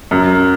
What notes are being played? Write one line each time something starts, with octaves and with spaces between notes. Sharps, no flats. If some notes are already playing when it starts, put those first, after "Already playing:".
F#2